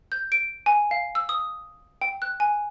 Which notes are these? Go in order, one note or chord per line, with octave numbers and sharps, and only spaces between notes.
G6
D7
G#5
F5
E6
D#6
G5
F#6
G#5